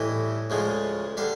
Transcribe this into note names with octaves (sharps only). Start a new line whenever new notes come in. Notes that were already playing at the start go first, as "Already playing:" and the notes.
Already playing: A2 E3 G3 D#5
D2 C#3 F3 G#3
D3 G3 F5